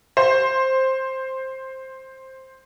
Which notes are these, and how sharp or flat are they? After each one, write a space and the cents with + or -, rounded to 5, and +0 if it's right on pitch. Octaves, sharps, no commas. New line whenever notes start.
C5 +10